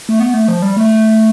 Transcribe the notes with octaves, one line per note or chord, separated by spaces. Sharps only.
A3
B3
A3
F3
G3
A3